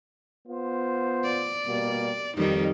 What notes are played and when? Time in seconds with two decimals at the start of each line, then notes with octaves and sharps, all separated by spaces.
0.47 B3 F4 C5
1.24 D5
1.67 B2 G3 A#3
2.37 F2 D#3 G3 D#4